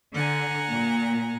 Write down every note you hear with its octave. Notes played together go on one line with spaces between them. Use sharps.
D3 F#5 G#5 A#5
A#2